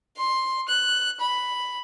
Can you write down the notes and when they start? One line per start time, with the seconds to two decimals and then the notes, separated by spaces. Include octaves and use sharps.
0.17 C6
0.68 F#6
1.20 B5